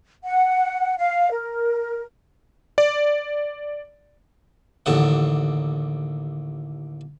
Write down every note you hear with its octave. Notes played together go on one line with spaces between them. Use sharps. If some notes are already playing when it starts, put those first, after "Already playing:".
F#5
F5
A#4
D5
A1 D#2 D3 F#5